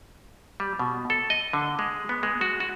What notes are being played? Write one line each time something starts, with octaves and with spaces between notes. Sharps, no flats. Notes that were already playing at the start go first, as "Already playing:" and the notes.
G3
B2
A4
D#5
D3
G#3
B3
G#3
F#4
F#4